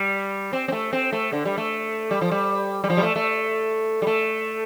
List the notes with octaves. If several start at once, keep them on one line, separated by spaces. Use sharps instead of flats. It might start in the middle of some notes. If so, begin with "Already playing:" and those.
Already playing: G3
C4
C4
A3
C4
A3
D3
G3
A3
G3
F3
G3
G3
F3
G3
A3
A3
G3
A3